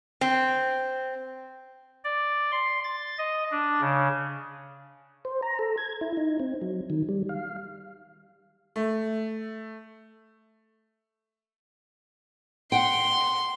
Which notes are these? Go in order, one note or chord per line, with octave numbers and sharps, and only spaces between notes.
C4
D5
C6
A6
D#5
D4
C#3
C5
A#5
A4
G#6
E4
D#4
C4
F#3
D#3
G3
F5
A3
F#5 G5 C6